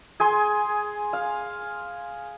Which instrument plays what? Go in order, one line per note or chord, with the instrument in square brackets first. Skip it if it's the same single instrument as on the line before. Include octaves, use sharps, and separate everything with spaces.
[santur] G#4 G#5 C6
F5